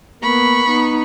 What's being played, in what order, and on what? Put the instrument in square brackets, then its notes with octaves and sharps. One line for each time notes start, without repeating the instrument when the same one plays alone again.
[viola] A#3 B3 [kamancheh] B5 C#6
[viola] B3 D#4